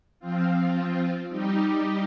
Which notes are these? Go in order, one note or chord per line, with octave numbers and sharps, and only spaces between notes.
F3 C4 F4
G3 D#4 G4